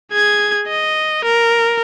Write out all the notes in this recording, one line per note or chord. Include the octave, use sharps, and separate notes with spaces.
G#4 G#6
D#5
A#4